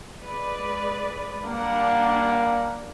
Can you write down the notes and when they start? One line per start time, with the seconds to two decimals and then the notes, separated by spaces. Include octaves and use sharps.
0.21 G#3 B4 D5
1.44 G3 A#3 D4 F#5